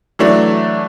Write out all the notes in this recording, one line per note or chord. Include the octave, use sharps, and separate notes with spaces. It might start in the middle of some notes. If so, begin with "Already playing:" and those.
E3 F#3 A3 D4